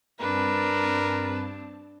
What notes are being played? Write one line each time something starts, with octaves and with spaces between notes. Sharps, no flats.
G2 C4 D4 A#4 B4 A5